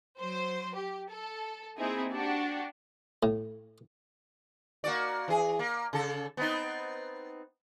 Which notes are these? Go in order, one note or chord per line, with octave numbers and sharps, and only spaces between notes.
F#3 C5
G4
A4
A#3 C4 D#4 E4 G#4
D4 F#4 G4
A2
A#3 F#4 D5
E3 G#4
A#3
C#3 A4
B3 C4 D#4